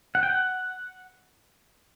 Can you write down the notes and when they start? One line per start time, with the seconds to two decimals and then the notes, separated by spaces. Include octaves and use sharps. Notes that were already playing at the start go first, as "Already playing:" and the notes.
0.15 F#5
0.23 G5
0.30 F#5